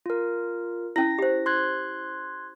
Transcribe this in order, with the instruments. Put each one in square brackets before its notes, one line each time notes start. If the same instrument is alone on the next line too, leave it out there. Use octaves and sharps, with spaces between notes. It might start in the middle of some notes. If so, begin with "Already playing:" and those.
[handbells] F4 A#4
[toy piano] C#4 E4 [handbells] A#6
[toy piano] G4 C5
[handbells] C6 F#6 G#6